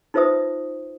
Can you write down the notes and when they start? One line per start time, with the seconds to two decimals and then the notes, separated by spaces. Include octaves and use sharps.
0.14 D#4 F4 B4 C5 E5 D#6